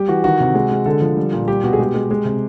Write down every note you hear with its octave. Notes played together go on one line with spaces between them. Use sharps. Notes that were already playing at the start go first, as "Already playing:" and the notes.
Already playing: G3 G4
E3 F#4
D#3 F#4
C3
G#3
G#3
D3 A4
F3
G3
A#2
G3 G4
B2 F#4
G#4
G#3 G4
G#3
G#3
C3